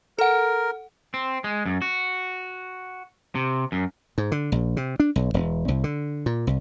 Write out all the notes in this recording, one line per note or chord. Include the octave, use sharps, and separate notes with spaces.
A4 A#4 F#5
C4
G#3
F#2
F#4
C3
F#2
G#2
D3
A#1
C3
D4
B1
E1
C2
D3
A#2
C2